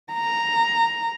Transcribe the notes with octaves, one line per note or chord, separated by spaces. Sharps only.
A#5